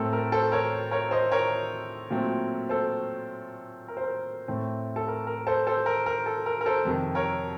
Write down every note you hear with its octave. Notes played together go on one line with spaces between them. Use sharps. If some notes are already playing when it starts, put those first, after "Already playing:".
Already playing: A2 A3 C4 A4 A#4
A#4
A4 C5
A#4 C#5
A#4 C#5
C5 D#5
A#4 C#5
A#2 F#3 A3 C4
A4 C5
A#4
C5
A#4
A2 A3 C4
A4
A#4
A#4
A4 C5
A4 C5
A#4
A#4
A4
A#4
A#4
A4 C5
F2 C3 D#3
A#4 C#5